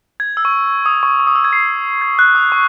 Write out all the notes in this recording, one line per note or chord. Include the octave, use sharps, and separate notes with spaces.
G#6
E6
C#6
D#6
C#6
C#6
D#6
E6
G#6
C7
G#6
F#6
D#6
C#6